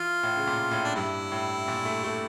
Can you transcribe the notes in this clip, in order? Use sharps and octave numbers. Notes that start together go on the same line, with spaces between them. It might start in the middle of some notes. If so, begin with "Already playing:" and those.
Already playing: E3 F4
A2
C#3
A#2
A2
D4
G2 E4
A2
A#2
A3
A3